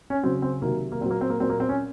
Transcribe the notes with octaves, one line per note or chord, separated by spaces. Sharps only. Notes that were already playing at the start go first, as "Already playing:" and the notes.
C#4
C#3 F#3 C4
C4
C3 D#3 F#3 A#3
A#3
A#2 F#3 C4
A#3
C4
A#3
A#2 F#3 C4
A#3
C4
C#4